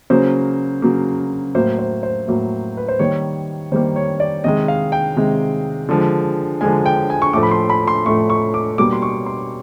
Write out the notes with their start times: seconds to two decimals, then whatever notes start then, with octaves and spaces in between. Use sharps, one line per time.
0.10 C#3 F#3 A#3 C5
0.82 C#3 F#3 A#3
1.55 A2 F#3 A#3 C5
1.79 C5
2.03 C5
2.28 A2 F#3 A#3
2.77 B4
2.88 C5
2.99 D#3 G3 A#3 C#5
3.72 D#3 G3 A#3 C5
3.96 C#5
4.20 D5
4.44 C3 D#3 G#3 D#5
4.68 F5
4.92 G5
5.16 C3 D#3 G#3
5.89 D3 F3 G#3
6.61 D3 F3 G#3 G#5
6.86 G5
7.10 G#5
7.22 C#6
7.33 A2 F3 A3 D6
7.43 B5
7.51 C6
7.70 B5
7.88 C6
8.06 A2 F3 A3 C#6
8.30 C#6
8.54 D6
8.78 B2 G3 A#3 D6
8.93 C6
9.02 C#6
9.26 C6